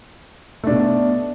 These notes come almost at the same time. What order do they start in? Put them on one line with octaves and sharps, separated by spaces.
A3 D4 B2